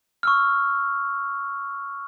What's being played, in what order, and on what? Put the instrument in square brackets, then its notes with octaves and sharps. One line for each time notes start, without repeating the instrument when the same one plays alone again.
[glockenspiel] C#6 E6 F6